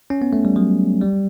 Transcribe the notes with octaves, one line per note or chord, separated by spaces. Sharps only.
C#4
B3
A3
G3
F#3
G3